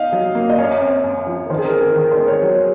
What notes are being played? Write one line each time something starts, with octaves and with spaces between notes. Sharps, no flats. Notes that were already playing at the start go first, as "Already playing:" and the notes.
Already playing: D#4 D#5 F5
F#3
A#3
D#5
F#2 C#5
C4
F#2
F3
A#4
D#3 C5
G#4
A#4
C4
G#4
D#3 A#4
C5
G#3
C#5
F#3